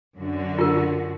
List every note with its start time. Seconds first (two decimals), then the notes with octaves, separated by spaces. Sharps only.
0.18 F#2 D3 F#4
0.59 F4 A#4